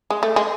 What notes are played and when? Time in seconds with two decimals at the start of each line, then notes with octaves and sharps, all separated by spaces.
0.10 G#3
0.23 A3
0.36 G#3